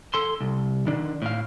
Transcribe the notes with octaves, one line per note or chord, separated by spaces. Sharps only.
A4 C6
C2
D#3 D4
A2 F5